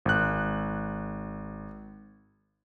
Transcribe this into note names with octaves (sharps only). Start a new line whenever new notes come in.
G#1 F#6